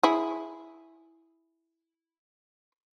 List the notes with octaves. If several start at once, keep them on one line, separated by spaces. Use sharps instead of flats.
E4 G#4